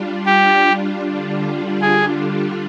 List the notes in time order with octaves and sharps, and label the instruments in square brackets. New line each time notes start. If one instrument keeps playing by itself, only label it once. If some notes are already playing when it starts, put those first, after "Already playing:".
Already playing: [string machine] G3 D4 F4
[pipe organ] G4
[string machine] D3 G3 D4 F4
[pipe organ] G#4